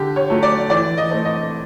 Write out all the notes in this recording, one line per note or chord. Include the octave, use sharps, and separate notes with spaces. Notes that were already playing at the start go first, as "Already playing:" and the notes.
Already playing: D3 G4
C#5
F#3 A3
D5
E3 D5
D#5
A3 C4
D#5